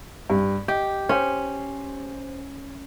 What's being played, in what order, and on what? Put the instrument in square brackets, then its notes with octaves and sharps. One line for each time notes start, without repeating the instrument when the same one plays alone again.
[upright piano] G2
[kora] G4 [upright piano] D#5
[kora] C#4 [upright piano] C5